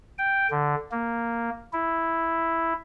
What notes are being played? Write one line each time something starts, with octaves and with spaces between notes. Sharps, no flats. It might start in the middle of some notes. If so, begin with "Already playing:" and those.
G5
D3
A#3
E4